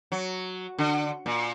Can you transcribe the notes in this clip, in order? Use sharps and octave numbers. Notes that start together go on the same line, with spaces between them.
F#3
D3
A#2